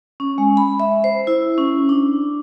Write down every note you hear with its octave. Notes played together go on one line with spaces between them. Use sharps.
C#4
G#3
B5
E5
C5
E4
C#4
D4